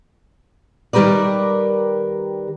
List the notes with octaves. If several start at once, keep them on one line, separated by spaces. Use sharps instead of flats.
D#3 G3 G4 A#4 B4 D5